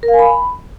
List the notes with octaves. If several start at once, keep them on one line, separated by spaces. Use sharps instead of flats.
A#4
F5
G#5
B5